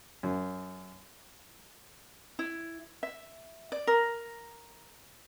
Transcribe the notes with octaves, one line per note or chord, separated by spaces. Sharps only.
F#2
E4
E5
D5
A#4